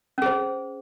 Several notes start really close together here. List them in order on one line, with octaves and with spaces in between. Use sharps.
C#4 G#4 C5